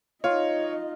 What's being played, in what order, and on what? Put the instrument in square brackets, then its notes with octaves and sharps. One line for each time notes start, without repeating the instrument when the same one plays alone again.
[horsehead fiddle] D#4 D#5 [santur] F4 F5 [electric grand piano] C#5